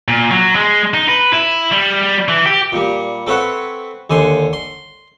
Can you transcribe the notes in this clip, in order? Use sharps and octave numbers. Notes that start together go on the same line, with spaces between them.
A#2
F#3
G#3
D#4
B4
E4
G3
E3
G4
A#2 G3
C4 A4 B4 C#5 E5 F#5
D#2 D3 G#5 C6
C6